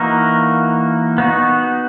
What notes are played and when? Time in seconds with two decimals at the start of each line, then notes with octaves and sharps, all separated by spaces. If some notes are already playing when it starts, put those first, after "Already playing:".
Already playing: E3 A#3 D#4 F#4 A#4
1.18 B3 D#4 F#4